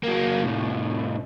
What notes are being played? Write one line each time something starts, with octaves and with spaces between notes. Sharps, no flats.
F#3 A#3
C2 A2